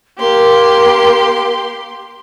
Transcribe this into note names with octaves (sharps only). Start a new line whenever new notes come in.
A#3 G4 C6